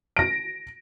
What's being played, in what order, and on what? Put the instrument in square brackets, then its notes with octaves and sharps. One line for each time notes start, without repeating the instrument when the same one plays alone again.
[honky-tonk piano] A#6 D7